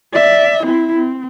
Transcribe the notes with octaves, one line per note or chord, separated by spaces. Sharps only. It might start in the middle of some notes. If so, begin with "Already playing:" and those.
D5 E5
C4 E4
C4